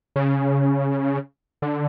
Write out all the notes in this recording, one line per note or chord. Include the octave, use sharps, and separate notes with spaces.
C#3
D3